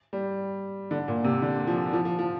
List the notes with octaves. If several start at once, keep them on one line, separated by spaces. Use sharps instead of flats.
G3
D3
A#2
C3
D3
F3
F3
F3
F3